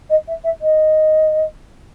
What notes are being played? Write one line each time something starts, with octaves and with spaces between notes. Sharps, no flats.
D#5
E5
E5
D#5